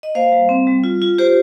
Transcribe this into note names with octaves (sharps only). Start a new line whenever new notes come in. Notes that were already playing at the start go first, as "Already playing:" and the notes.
D#5
A#3 C5 F5
G3
C4
G3
F4
F4
F4 G4 C5